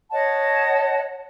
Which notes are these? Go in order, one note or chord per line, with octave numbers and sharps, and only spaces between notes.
C#5 D#5 F#5 A5